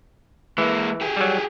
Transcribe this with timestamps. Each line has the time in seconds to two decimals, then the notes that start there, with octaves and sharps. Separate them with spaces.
0.58 E3 G#3 A#3
1.01 G4 G#4
1.17 F#3 G3